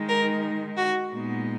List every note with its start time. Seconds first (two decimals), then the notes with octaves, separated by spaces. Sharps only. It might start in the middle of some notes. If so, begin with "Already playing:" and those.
Already playing: D#3 G#3 D#4
0.08 A#4
0.77 F#4
1.12 A#2 G#3 B3 D#4